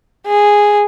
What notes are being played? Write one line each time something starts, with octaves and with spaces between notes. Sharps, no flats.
G#4